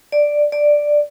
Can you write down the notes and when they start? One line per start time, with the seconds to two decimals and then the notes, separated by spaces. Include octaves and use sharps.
0.12 D5
0.52 D5